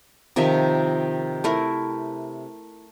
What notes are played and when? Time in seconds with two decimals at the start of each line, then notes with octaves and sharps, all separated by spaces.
0.36 C3 D#3 F3 E5
1.44 A3 E4 A#4